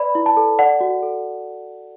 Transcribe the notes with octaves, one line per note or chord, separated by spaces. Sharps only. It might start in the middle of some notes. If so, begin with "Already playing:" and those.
Already playing: B4 D5 B5
E4
A5
A4
D5 F#5
F#4
A4